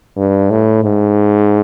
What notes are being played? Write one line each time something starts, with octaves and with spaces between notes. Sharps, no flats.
G2
A2
G#2